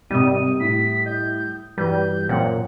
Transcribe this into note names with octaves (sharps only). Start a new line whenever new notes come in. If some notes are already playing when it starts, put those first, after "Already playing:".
G#1 C3 G3 D#6 D#7
A2 B6
D#5 G6
G2 E3 G3 F#4 B4 G6
F#2 A#2 C5 C#5 F#5 G5